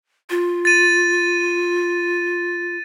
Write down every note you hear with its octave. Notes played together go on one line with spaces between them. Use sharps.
F4
A6 D#7